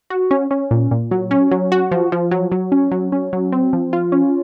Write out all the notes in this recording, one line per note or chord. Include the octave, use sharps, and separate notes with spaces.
F#4
C#4
C#4
A#2
A#2
F#3
C#4
F#3
F#4
F3
F3
F#3
F#3
C#4
F#3
C#4
F#3
C4
F3
F4
C#4